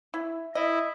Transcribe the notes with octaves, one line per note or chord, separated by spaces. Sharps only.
E4
E4 D#5